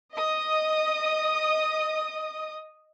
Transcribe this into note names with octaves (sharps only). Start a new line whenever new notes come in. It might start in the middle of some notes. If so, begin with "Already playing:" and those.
D#5 D#6